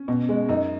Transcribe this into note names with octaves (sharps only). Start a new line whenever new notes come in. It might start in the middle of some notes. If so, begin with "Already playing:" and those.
Already playing: C#4
B2
G#3
F#2 D#4